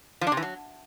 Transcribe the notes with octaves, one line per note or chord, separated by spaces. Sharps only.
F3
D4
C3
E3
F#3